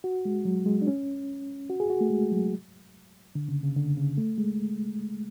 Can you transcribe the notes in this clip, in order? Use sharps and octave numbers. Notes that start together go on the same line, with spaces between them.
F#4
G#3
F#3
G#3
D4
C#4
F#4
G#4
F#4
A3
G#3
F#3
D3
C#3
C#3
D3
C#3
A3
G#3